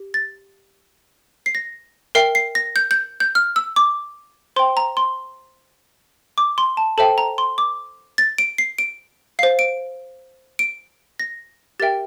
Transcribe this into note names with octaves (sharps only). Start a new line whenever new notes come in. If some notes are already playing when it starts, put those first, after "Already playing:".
Already playing: G4
A6
C7
A#6
A#4 E5 G5 C7
C7
A#6
G6
G6
G6
F6
E6
D6
C5 G5 C6
A#5
C6
D6
C6
A5
A4 C5 E5 G5 A5
A#5
C6
D6
A6
D7
C7
D7
C5 F5 C7
D7
D7
A#6
G4 A#4 E5 G5 A6